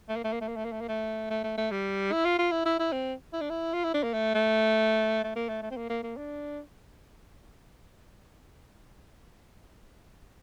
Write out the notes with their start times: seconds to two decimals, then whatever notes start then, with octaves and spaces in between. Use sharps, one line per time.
0.09 A3
0.16 A#3
0.24 A3
0.33 A#3
0.41 A3
0.48 A#3
0.56 A3
0.65 A#3
0.72 A3
0.81 A#3
0.88 A3
1.30 A3
1.44 A3
1.58 A3
1.71 G3
2.12 E4
2.25 F4
2.39 F4
2.52 E4
2.66 E4
2.79 E4
2.92 C4
3.33 E4
3.41 D4
3.50 E4
3.73 F4
3.84 E4
3.94 D4
4.04 A#3
4.14 A3
4.35 A3
5.24 A3
5.36 A#3
5.49 A3
5.62 A3
5.71 C4
5.77 A#3
5.90 A#3
6.03 A#3
6.17 D4